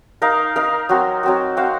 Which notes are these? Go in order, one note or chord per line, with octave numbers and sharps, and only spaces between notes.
D#4 A#4 F5
D#4 A#4 F5
F#3 C4 F#4
F#3 C4 F#4
C4 F#4 C5 F5